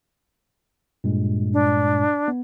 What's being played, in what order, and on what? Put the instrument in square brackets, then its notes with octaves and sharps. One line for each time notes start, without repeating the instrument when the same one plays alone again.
[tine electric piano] G2 A#2 G#3
[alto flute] D4
[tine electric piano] B3